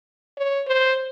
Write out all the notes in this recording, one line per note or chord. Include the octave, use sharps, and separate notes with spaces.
C#5
C5